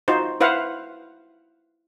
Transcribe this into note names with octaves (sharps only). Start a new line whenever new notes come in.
D#4 F4 F#4 C5
E4 B4 C5 F5 F#5